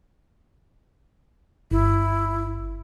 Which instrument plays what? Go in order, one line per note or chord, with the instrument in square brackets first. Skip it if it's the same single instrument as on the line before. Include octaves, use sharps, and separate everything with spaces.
[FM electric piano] G1 [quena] E4